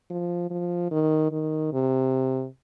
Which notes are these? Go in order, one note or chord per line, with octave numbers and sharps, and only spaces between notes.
F3
F3
D#3
D#3
C3